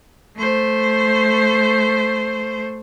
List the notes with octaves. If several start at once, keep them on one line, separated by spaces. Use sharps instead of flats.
A3 C5